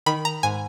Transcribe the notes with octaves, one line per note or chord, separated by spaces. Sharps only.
D#3 B5
A#5
G#2 G#5